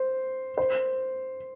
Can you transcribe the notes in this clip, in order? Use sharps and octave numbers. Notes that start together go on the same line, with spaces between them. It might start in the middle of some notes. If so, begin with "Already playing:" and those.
Already playing: C5
C5